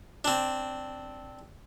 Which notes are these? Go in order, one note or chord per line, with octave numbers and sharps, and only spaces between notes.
C4 D4